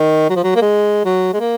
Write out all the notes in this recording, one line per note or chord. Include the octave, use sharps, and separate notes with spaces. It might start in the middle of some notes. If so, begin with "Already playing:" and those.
Already playing: D#3
F#3
F3
F#3
A#3
G#3
F#3
G#3
A#3